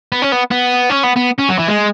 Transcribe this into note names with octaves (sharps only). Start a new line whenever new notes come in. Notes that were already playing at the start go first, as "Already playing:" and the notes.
B3
C#4
B3
B3
C#4
B3
B3
C#4
F#3
E3
G#3